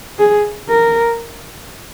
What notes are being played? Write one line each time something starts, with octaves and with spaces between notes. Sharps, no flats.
G#4
A#4